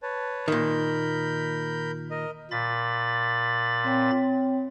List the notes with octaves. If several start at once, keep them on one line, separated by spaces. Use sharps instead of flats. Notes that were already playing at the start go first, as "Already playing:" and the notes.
B4 C#5 A5
A#2 D#3 A#4 B5 G6
A#4 D#5
A#2 B5 A6
C4 C#5 G5